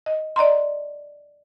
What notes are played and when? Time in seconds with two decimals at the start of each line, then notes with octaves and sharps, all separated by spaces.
0.06 D#5
0.36 D5 D#5 A#5 C6